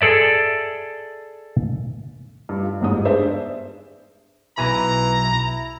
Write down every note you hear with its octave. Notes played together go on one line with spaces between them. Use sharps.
G#4 A4 D5 E5
G2
F4
G1 E2 G#2 G3 D#6
D4 G4 G#4 C5 D5 E5
B1 E3 G#5 A#5 B5
E4